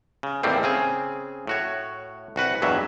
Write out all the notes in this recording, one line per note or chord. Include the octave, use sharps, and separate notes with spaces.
C#3
E2 A2 D#3 G3 A#3 C4
C#3 C4 G#4
A2 F#4 C#5
C2 F#4 B4 F#5
E2 G2 B2 F#3 E5